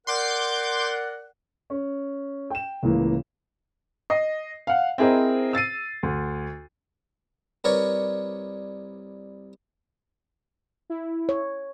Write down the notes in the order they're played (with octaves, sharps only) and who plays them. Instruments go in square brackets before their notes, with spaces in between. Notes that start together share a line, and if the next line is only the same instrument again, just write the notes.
[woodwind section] A#4 D5 F#5 [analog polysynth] C6 D6 G6
[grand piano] C#4
G5 E7
C#2 A2 E3 A#3
D#5 C7
F5 F#5
C4 E4 G#4 A#4 C5 D#5
E6 A6 C7 D#7
D2
[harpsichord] C2 A#4 B4 C#5 D5 C#6
[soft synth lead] E4
[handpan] C#5